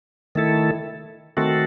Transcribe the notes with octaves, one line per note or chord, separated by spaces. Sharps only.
D#3 A3 E4 A4
D#3 A3 C4 F#4 A4